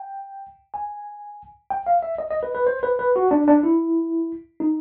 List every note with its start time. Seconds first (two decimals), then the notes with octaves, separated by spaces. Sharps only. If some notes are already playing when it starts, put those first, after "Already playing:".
Already playing: G5
0.74 G#5
1.70 G5
1.86 F5
2.03 E5
2.18 D#5
2.30 D#5
2.43 B4
2.55 B4
2.67 C5
2.83 B4
2.99 B4
3.16 F#4
3.31 D4
3.47 D4
3.63 E4
4.60 D#4